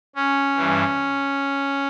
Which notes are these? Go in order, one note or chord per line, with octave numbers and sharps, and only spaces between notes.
C#4
G2 E3